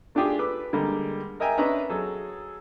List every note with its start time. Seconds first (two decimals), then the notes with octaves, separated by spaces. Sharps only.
0.15 A3 D4 F4 G4 G#4
0.38 A4 B4 D6
0.73 D3 G3 G#3 A#3
1.40 A#4 D#5 E5 G5 G#5 A#5
1.58 C#4 D4 B4 D#5 E5 A#5
1.90 F#3 G#4 A4